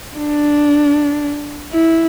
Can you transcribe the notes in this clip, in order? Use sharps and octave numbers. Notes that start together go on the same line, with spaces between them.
D4
E4